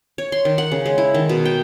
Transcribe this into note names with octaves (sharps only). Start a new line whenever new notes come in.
C#5
C6
D#3
F#5
C#3
G#3
E4
D#3
B2
G5